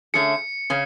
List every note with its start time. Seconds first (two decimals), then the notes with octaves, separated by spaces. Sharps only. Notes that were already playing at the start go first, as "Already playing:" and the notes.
0.14 D3 A3 C#4 G#4 C#7
0.70 C#3 C#4